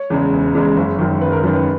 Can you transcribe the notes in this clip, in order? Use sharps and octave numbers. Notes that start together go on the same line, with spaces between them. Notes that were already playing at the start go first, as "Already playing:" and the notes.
Already playing: C#5
E2 C#3 G#3
E1
E2 C#3 G#3
F#1
F#2 D#3
F#1 B4
A#4
F#2 D#3 A#4
B4